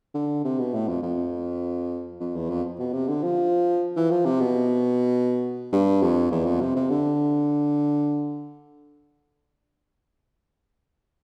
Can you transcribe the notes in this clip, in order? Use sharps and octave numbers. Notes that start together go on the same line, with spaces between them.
D3
C3
B2
A2
F2
F2
F2
E2
F2
B2
C3
D3
F3
E3
F3
C3
B2
G2
F2
E2
F2
C3
C3
D3